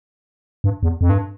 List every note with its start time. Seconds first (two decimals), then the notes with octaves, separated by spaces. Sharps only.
0.64 G2
0.83 E2
1.01 F2
1.09 G2